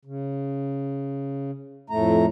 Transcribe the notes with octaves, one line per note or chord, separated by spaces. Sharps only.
C#3
F2 A2 A3 A#5